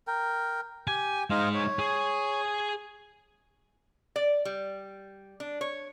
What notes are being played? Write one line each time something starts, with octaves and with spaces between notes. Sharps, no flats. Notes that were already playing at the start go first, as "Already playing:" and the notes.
A#4 G5
G4 G5 G#5
G#3 D#4 C5 D#5 F5
C#5
G#4
D5
G3
D4
C#5